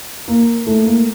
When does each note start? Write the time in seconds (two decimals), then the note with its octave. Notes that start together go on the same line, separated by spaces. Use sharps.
0.28 A#3
0.67 A3
0.85 A#3